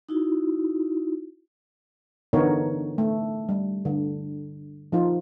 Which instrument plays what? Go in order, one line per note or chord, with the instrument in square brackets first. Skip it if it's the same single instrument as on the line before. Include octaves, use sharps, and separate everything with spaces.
[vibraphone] D#4 E4 F#4
[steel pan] D3 E3 B3 D#4 A#4 C#5
A3
G3
D3
F3 D#4 F4